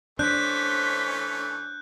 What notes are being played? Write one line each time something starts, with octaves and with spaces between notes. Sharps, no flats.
E3 A3 C#4 D4 C5 F#6 G6 B6